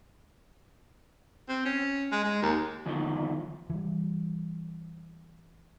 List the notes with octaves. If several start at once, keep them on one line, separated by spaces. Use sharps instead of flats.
C4
C#4
G#3
G#3
D#2
E2 D3 D#3 F3 F#3
E3 G3